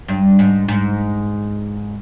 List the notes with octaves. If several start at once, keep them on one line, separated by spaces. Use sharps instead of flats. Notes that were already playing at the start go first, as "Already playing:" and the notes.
G2
G#2
G#2